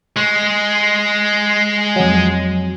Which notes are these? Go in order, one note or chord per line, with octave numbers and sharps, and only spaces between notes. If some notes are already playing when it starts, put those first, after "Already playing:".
G#3
F2 F#3